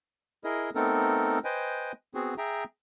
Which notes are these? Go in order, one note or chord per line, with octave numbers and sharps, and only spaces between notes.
E4 G#4 A#4 D#5
A3 B3 C4 D#4 A4 A#4
B4 C5 D#5 G5 G#5
B3 C4 F#4 G#4
G#4 E5 G5 A#5